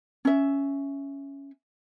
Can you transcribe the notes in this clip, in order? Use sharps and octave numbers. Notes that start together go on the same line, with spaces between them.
C#4 E5